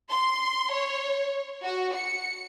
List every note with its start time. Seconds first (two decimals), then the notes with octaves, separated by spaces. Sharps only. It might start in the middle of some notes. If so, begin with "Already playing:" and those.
0.11 C6
0.72 C#5
1.64 F#4
1.96 C#7